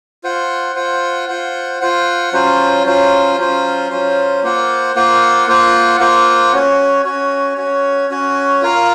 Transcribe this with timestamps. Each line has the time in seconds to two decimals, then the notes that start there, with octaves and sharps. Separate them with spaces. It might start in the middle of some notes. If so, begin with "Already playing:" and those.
0.24 F4 C5 F#5
0.75 F4 C5 F#5
1.28 F4 C5 F#5
1.81 F4 C5 F#5
2.33 F#3 C#4 F4 C5
2.86 F#3 C#4 F4 C5
3.38 F#3 C#4 F4 C5
3.90 F#3 C#4 F4 C5
4.43 A#3 F4 C5 F#5
4.95 A#3 F4 C5 F#5
5.48 A#3 F4 C5 F#5
6.00 A#3 F4 C5 F#5
6.53 C#4 F#4 C#5
7.05 C#4 F#4 C#5
7.58 C#4 F#4 C#5
8.10 C#4 F#4 C#5
8.62 F4 A#4 F5